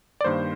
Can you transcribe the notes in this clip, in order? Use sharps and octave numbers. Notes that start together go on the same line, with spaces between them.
D5
G2 D#3 A#3 C5